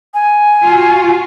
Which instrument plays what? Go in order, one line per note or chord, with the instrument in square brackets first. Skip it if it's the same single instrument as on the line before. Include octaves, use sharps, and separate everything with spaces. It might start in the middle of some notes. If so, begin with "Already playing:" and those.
[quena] G#5
[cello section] F4 F#4